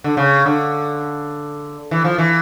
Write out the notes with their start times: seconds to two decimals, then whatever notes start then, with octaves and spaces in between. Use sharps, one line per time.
0.04 D3
0.17 C#3
0.46 D3
1.91 E3
2.04 F3
2.18 E3